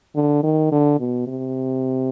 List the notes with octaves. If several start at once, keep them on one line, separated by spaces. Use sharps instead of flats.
D3
D#3
D3
B2
C3